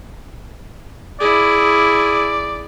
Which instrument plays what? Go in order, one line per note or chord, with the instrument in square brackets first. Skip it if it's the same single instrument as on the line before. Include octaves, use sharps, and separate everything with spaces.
[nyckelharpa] E4 G#4 [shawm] D5